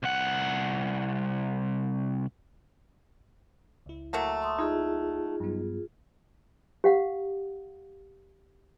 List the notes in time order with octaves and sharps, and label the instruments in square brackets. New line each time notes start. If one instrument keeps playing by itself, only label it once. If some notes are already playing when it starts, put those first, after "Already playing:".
[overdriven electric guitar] C2 F#5
[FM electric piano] C#2 E4
[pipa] F#3 A3 A#3
[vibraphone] C6 C#6 D#6
[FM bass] D#4 [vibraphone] F4 G#4
[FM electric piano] G2 F#3 B3
[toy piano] G4 F5 F#5